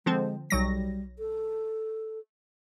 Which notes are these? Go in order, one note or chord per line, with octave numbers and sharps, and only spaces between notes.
D3 F3 G#3 C4
B1 F#3 G3 A#6
A4